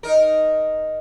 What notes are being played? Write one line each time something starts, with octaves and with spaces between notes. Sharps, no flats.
D#4 A#4